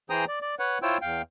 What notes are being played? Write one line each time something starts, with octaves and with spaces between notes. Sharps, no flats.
E3 G#4 C5 G5 A#5 D#6
D5
D5
B4 C#5 F#5
E4 F4 C5 C#5 G5 E6
E2 F5 G5